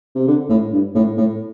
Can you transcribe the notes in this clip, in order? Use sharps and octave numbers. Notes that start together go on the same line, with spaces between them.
C3
D3
A2
G2
A2
A2